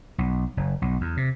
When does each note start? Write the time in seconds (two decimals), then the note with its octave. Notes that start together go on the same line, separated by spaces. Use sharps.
0.18 B1
0.57 F#1
0.82 B1
1.01 E2
1.17 C3